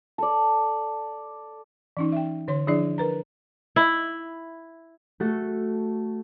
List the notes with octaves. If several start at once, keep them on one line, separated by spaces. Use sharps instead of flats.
A4 D5
E3 C#4 D#4
E5 G5
D3 C#5 C6
F3 D4 E4 G#4 D5
A#4 B4 A#5
E4
A3 F#4 A4